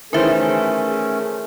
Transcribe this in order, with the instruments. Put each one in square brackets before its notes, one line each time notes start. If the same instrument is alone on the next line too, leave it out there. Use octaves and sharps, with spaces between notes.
[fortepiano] D#3 E3 C5 [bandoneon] A3 C#4 [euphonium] G#4 [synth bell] A#4 E5